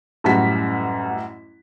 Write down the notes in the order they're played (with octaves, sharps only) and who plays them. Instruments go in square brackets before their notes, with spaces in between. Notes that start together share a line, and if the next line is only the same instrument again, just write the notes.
[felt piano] A1 F#2 G3 F#4 B6